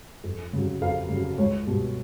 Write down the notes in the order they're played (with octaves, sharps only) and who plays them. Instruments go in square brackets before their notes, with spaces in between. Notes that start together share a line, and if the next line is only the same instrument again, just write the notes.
[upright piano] F2
C#3 F#3
F2 F5
C#3 F#3
C#2 C#5
B2 G3